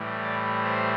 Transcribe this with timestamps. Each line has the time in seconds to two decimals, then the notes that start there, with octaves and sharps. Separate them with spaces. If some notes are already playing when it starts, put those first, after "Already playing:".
Already playing: A2 E3 G3
0.23 D5
0.63 C5